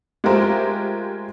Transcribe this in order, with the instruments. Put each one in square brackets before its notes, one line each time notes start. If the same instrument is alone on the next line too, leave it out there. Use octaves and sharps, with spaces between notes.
[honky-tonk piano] G#3 A3 F4 G4 A#4 C5